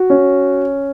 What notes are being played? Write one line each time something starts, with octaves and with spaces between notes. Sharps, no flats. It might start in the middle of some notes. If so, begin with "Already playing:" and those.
Already playing: F#4
C#4